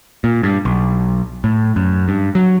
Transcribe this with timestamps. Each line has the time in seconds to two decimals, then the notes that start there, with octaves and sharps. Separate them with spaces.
0.24 A#2
0.43 G2
0.65 B1
1.44 A2
1.76 F#2
2.08 G2
2.35 F#3